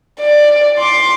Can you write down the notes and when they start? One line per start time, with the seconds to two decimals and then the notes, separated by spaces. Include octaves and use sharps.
0.21 D5
0.78 C6 D6